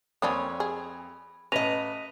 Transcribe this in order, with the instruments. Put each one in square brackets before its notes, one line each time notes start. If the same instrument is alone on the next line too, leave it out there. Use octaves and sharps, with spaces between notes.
[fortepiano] F2 C#5 D#6 [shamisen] A#3 C#4 D4 [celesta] B5
[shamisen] G#4
[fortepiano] A1 [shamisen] C#4 [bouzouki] B4 D#5 [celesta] A#6 D#7 F7